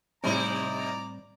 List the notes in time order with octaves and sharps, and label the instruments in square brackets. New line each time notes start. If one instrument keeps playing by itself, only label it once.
[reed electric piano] A2 G3 C4 [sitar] C3 D#4 E4 [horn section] D5 A#5